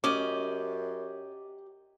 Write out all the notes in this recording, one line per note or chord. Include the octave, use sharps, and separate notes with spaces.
F#2 C#4 G4 D5 D#5 D6